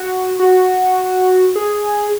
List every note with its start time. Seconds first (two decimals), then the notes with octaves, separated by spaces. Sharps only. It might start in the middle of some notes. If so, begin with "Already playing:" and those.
Already playing: F#4
0.40 F#4
1.56 G#4